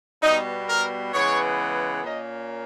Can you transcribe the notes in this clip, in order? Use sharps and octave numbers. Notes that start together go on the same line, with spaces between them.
B2 G3 B3 D#4
A#4
C#3 E3 G#3 B3 C#5
A#2 A#3 C#4 D#5